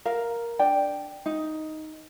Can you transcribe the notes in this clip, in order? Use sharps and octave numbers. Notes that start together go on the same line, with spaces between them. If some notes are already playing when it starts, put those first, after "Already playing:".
A#4 F5
D4 D5 G5
D#4